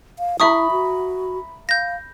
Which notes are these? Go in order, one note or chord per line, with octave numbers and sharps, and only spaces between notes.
F5
E4 E5 A#5 B5 C#6 D#6
F#4
F5 G6 A#6